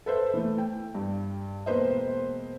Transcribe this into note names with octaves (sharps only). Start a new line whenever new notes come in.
A4 B4 C5 E5
E3 A3
G5
G2
E1 A#3 B4 C5 D#5